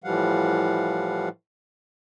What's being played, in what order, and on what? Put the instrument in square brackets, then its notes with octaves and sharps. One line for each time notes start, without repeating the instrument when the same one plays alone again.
[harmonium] A2 E3 F3 G3 F5 F#5